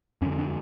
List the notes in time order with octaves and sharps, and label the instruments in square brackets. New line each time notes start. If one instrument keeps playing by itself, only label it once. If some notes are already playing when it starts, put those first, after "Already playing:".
[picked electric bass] F2 C#4
D3
D4